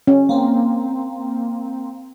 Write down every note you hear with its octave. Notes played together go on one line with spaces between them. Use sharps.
C#4
A#3 C4